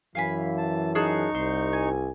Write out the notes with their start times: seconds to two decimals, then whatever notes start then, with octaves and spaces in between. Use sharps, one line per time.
0.15 F#2 E3 F5 G#5 B5
0.58 A5
0.95 D#4 G#4 A5 C#6 F#6
1.35 C2 C5
1.73 G#5